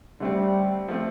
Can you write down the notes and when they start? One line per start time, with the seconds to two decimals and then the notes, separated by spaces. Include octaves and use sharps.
0.20 D3 G3 A3 C4
0.88 F3 A3 C4